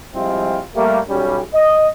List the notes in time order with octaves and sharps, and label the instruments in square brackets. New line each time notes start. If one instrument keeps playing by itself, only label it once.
[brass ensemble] F3 G3 G#3 C4 E4 F4
G3 A3 A#3
B1 G3 C#4
D#5